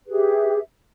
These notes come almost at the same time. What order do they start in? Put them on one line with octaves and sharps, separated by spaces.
B4 G#4 G4 E5